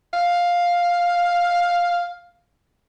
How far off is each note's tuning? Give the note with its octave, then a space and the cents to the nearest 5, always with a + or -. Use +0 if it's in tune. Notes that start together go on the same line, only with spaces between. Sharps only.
F5 +5